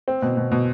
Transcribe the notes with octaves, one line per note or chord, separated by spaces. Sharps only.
C4
B2
B2
B2